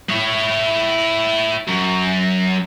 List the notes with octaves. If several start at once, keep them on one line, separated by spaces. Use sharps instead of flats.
E4 C#5
F#2